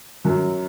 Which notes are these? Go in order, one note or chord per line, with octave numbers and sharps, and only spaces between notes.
F#2 F#3